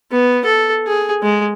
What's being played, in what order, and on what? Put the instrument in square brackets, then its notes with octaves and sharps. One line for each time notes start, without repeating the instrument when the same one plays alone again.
[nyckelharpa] B3
A4
G#4
G#3